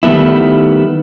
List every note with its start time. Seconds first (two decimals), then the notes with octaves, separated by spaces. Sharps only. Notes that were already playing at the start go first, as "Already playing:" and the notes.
0.03 D#3 G3 A3 B3 E4